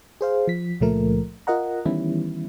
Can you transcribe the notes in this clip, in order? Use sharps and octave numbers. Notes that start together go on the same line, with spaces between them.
G#4 C5 F5
F3 B6
C#2 A#2 F3 A3 A#4
F4 A#4 D#5 F#5 A#5
D#3 E3 G3 B3 C#4 E4